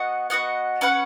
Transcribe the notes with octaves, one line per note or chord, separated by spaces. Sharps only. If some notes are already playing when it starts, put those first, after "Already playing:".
Already playing: B3 F#4 D#5 F#5
B3 F#4 D#5 F#5
C#4 B4 F#5